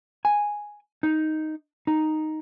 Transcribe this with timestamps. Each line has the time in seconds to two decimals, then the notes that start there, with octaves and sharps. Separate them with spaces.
0.25 G#5
1.03 D#4
1.87 D#4